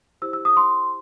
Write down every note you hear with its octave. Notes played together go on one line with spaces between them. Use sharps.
E4 G4 C5 E6
E6
D#6
C6